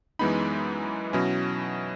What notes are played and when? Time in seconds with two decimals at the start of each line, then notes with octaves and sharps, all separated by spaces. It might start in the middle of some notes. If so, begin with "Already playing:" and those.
0.19 F#2 E3 G#3 B3 D#4 B5
1.13 B2 F#3 C#4 E4